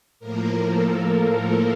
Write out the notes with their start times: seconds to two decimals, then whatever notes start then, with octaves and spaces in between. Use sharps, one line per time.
0.19 A2 F3 A#3 A#4
0.64 A4